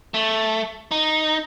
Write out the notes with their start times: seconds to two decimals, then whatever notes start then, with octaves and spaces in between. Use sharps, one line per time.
0.14 A3
0.91 D#4